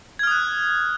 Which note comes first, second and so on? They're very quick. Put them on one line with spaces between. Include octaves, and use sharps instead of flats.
G#6 F6 D#6 F#6